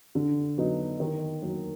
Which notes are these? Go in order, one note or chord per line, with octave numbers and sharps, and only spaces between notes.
D3
F#3 B3 D#4
D#3
F#3 A#3